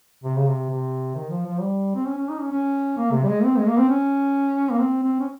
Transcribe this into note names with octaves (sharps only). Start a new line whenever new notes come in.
C3
C#3
C3
C3
D#3
F3
F3
G3
C4
C#4
C#4
D#4
C#4
C#4
A#3
C3
G3
G#3
C4
G#3
A#3
C4
C#4
A#3
C4
C4
C#4